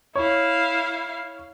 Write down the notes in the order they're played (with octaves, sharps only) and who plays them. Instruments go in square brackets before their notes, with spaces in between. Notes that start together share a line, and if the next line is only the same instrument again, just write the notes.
[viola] E4 F5 [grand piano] C#5